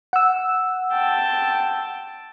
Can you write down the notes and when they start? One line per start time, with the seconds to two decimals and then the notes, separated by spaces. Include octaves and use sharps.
0.13 F#5 E6
0.93 G5 A5